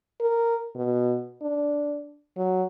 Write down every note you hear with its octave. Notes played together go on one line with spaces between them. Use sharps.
A#4
B2
D4
F#3